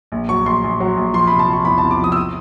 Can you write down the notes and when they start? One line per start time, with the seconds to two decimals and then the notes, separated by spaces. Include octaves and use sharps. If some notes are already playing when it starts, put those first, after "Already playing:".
0.12 A#1
0.29 F#3 C#6
0.46 A#1 C6
0.64 A#1
0.80 F#3
0.97 A#1
1.14 F3 C6
1.27 C3 B5
1.39 A5
1.48 F3
1.53 C#6
1.65 E2 B5
1.78 C3 A5
1.91 D6
2.00 F3 D#6
2.12 E6
2.17 D#6